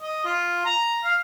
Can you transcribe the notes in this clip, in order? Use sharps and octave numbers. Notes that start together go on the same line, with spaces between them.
D#5
F4
A#5
F5